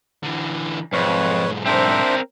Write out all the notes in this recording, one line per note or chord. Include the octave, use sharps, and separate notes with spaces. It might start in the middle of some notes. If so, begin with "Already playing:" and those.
D3 E3
B1 F2 G#2 B4 C#5
C4 D4 A#4 C5 E5